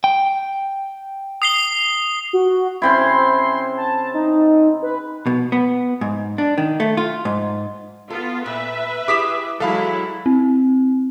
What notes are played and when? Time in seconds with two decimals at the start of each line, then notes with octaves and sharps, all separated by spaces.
0.04 G5
1.42 D#6 C7 G7
2.33 F#4
2.82 C#3 C4 E4 C6
3.77 A5
4.14 D#4
4.82 B4
5.26 B2
5.52 B3
6.01 G#2
6.38 D4
6.58 D#3
6.80 A3
6.97 F4
7.25 G#2
8.10 B3 F4 A4
8.46 A#2 B4 E5
9.08 E4 G4 G#4 D6 B6 E7
9.60 E3 F#3 G#3 E4 A4 F5 B5
10.26 C4